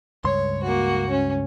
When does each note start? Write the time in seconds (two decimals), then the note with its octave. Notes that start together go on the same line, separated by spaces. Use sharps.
0.25 C#2 G2 C#5 C6
0.63 A#3 F#4
1.10 C#4